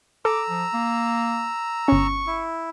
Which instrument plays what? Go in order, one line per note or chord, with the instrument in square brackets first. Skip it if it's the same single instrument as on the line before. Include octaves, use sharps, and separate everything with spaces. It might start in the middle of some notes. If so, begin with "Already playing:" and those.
[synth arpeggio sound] A4 [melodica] A#5 E6 [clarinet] D6
[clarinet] F3
A#3
[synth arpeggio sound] G1 C#4 [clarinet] C#6
[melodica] E4